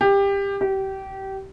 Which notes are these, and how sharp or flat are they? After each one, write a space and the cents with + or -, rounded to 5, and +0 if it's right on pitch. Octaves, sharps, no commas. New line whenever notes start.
G4 +20
G4 -25